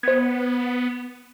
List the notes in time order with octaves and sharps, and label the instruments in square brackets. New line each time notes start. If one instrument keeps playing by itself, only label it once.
[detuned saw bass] B3 [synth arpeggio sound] C5 G#6